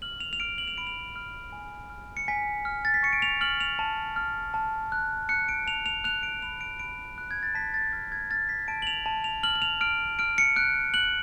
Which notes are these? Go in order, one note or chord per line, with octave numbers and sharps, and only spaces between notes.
F6 F#7
F7
F7
F6 D7
F#7
F7
B5 D7
F7
F6
G#5
F6
C#7
G#5 B6
F6
A6
B6
C#6 C#7
D7
F7
F6 F#7
F7
A5
F6
A5
F#6
F#6 C#7
D7
A5 F7
F7
F#6 F7
D7
B5 F7
D7
B5 D7
F#6
G#6
A6
A5 B6
A6
F6 A6
G#6
F6 A6
B6
A5 D7
F#7
F7
A5
F7
F6 F#7
F#7
F7
F6 D7
F6 D7
C#7
F#6 D7
F#6 F#7